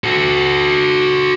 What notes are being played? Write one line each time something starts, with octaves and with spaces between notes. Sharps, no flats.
F#4 A4